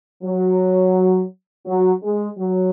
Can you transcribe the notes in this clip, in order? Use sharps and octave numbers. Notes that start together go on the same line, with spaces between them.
F#3
F#3
G#3
F#3